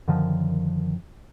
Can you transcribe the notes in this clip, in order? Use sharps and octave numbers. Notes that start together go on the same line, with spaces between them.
F#2 D3 D#3 F3